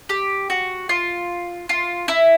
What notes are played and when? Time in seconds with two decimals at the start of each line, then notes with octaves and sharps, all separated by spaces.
0.09 G4
0.50 F#4
0.89 F4
1.69 F4
2.08 E4